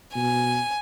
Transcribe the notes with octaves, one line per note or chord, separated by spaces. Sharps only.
B2 G#5